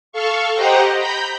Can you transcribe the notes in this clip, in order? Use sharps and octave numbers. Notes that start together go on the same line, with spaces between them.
A4 F5 C#6
G4 C5 D#5 F#5 G5 A#5
A#5 B5 G6